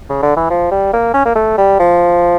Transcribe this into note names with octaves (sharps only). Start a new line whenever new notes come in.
C#3
D3
E3
F3
G3
A#3
C#4
A#3
A3
G3
F3